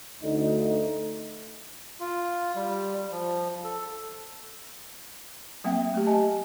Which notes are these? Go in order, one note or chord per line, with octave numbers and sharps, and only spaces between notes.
D2 D#4
F4
G3
F3
A4
F#3 A#3 C4 E5 F#5 G5
A3 G4
D#5 G#5 A5